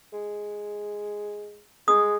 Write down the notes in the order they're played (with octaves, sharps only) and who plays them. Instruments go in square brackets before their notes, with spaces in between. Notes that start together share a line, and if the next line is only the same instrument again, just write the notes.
[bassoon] G#3
[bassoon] G#3 [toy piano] D#6